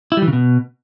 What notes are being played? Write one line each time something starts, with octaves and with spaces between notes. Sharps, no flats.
E4
G3
E3
C#3
B2